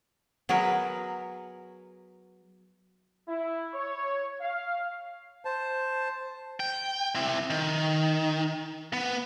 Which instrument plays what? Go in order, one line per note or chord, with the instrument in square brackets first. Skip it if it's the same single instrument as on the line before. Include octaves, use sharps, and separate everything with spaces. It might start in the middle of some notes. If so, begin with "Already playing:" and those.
[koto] F#3 B3 G#4 A#4 B4
[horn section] E4
C#5
F5
[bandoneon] C5 A5
[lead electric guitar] G5
C4 E4
D#3
B3